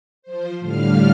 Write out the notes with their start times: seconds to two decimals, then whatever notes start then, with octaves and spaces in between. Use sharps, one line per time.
0.22 F3 C5
0.59 A2 D3 G3 F5 F6